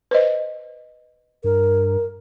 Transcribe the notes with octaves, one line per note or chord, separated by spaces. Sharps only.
B4 C5 D#5
G2 A#4